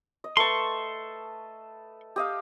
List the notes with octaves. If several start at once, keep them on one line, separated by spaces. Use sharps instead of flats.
D#5
A3 B4 A5 C6 C#6
G4 D#5 F5